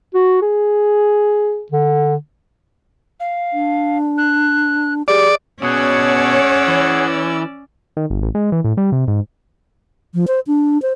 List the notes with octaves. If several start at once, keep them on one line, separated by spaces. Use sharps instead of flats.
F#4
G#4
D3
F5
D4
F#6
G4 G#4 D5
B2 C#4 G#4 C#5 D5 F#5 E6
E3
D#3
G1
A1
G#3
E3
A2
G3
C3
G#2
F3
C5
D4
C5